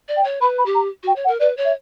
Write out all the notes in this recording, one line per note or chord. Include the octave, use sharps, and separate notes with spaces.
D5
G5
C#5
B4 B5
B5
G4
A#5
F#4 G5
C#5
F#5
A#4
B4 D5
C#5
E5